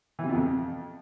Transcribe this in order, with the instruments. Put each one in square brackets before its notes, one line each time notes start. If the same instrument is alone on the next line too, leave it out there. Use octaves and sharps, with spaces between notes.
[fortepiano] E3
C3
B2
F2